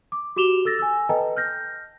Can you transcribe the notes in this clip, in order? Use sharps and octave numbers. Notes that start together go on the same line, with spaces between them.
D6
F#4 G4 D6 E7 F7 G7
A4 E6 A6 A#6
G#5 E6
A4 B4 D#5 G5 A5 A#5
F6 G6 A#6